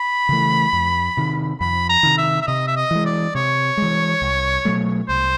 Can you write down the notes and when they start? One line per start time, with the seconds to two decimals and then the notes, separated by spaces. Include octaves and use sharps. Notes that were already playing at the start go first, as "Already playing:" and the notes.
Already playing: B5
0.29 C#3 E3 A3
0.73 F2
1.17 C3 D#3
1.60 F2 B5
1.89 A#5
2.03 C3 D#3
2.18 E5
2.42 E5
2.47 C3 D#5
2.67 E5
2.76 D#5
2.91 E3 G#3
3.06 D5
3.35 C3 C#5
3.77 E3 G#3
4.22 C2
4.65 B2 F#3 A3
5.08 C2 C5